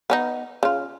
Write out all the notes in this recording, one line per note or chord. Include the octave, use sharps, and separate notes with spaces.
B3 C#4 D#4
C#3 F4